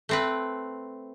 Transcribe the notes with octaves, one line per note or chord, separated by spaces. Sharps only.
A3 C4 B4